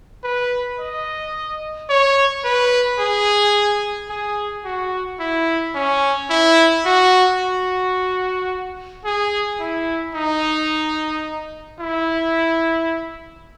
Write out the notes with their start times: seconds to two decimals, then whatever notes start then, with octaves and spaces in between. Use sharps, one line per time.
0.24 B4
0.79 D#5
1.89 C#5
2.44 B4
2.99 G#4
4.09 G#4
4.65 F#4
5.20 E4
5.75 C#4
6.30 E4
6.85 F#4
7.39 F#4
9.05 G#4
9.60 E4
10.15 D#4
11.80 E4